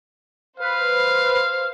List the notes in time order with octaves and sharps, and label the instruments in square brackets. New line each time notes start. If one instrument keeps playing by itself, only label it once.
[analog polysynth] B4 [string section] C5 [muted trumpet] F5